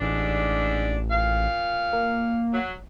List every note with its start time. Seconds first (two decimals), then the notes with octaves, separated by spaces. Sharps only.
0.01 A1 G#2 D4
1.11 A#2 F5
1.93 A#3
2.53 F#3